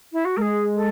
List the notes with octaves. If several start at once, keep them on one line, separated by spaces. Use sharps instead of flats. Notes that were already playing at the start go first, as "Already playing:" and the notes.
E4
F#4
G#3 G#4 A#4
A4